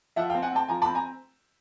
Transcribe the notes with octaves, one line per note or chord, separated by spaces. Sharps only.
F3 E5 F#5
F5 G5
C4
F#5 G#5
C4 G5 A5
F3 G#5 A#5
A5 B5
C4
G#5 A#5